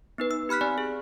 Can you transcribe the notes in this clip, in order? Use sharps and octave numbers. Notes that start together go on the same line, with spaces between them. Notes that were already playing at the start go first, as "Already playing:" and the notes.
B3 D#4 B4
E6
G4 B5 F6 F#6 B6
C4 D5 G#5
G#4